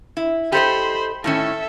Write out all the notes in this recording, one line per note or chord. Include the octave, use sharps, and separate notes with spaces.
E4
G4 A4 C5 D#5 B5
A2 D#3 C#4 A4 E5